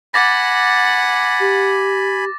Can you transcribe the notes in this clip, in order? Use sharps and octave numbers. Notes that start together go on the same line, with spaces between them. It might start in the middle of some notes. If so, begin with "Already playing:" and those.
F#5 G#5 B5 D6 A6 A#6
G4